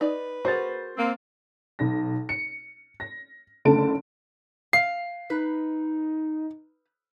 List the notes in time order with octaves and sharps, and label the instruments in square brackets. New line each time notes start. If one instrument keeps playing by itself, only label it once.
[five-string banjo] D#4 D5 [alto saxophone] B4
[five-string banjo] F#4 G#4 A#4 [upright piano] C5 A6
[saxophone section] A#3 C4
[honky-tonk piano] B1 A#6
C#7
A#6
F#1 D3 A3 A5 D7
[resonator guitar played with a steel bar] F5 [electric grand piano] C7
[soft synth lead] D#4 [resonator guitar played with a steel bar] B4